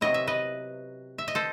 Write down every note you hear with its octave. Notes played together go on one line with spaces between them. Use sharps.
C3 F#3 B3 E4 D#5
E5
B4 D#5
E5
D#5
A4 C5